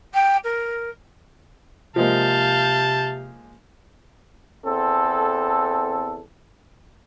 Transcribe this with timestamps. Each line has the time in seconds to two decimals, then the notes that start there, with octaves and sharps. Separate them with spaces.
0.13 G5
0.44 A#4
1.96 C3 F3 G#3 A#3 F5 A5 G6
4.65 E2 C4 A4